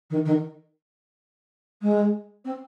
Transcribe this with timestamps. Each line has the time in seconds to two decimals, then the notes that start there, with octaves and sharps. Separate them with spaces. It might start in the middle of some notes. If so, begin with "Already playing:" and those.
0.10 D#3
0.25 D#3
1.82 G#3
2.45 C4